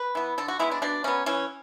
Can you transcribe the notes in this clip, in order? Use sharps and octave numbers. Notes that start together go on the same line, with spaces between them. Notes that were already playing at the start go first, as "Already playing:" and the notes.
Already playing: B4
E3 B3
D3 A4
F#4
G#3 B3 E4
D4
B2 D4
F#3 B3 C#4
E3 C#4